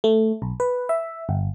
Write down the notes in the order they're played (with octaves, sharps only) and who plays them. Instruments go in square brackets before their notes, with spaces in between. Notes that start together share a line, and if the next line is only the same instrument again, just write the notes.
[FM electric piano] A3
B1
B4
E5
G1